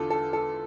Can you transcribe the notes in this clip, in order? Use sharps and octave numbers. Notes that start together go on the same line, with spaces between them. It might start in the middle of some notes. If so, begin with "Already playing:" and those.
Already playing: E2 D3 F4 A4
A4
A4